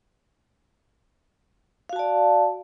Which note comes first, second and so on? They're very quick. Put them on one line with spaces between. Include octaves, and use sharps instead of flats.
F5 F#4 A5 D5